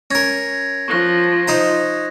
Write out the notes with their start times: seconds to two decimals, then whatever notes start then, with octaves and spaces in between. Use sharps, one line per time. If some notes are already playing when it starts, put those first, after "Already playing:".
0.11 C#4 A#4 G#6 A#6
0.88 F3 C#6 F#6 A#6
1.48 D#4 C5 A#5